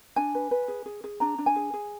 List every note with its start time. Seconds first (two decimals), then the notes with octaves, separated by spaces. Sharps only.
0.16 D4 G#5
0.35 B4
0.51 B4
0.68 G#4
0.86 G#4
1.04 G#4
1.20 D4 A#5
1.38 D4
1.46 G#5
1.56 G#4
1.74 G#4